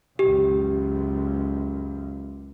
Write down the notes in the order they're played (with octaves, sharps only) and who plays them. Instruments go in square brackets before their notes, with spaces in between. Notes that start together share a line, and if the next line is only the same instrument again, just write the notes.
[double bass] C#2 F#2 [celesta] G4